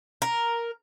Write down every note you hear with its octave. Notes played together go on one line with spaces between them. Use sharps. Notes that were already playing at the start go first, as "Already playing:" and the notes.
A#4